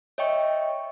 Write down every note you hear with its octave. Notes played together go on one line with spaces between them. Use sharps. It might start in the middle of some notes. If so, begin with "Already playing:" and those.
C#5 D#5 E5 G5 C#6